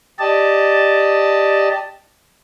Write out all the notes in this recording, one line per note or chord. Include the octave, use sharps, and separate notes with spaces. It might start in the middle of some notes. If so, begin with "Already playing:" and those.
G4 D5 D#5 A5